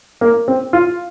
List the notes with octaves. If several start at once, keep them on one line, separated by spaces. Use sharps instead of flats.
A#3
C4
F4